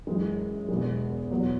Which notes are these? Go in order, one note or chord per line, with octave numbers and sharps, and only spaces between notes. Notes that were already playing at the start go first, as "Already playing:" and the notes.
F#2 E3 G#3 E4
E1 E2 B2 G#3
E2 B2 F#3